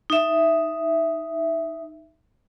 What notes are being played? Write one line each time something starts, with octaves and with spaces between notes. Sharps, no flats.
D#4 E5